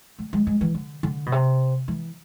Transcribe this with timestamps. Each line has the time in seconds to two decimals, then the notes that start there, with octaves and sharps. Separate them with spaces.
0.19 A3
0.33 G#3
0.47 G#3
0.61 E3
0.75 D3
1.03 D3
1.26 B2
1.32 C3
1.88 E3